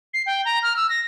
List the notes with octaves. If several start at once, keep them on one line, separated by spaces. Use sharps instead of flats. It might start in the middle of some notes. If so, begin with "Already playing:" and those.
C7
G5
A#5
F6
E6
A#6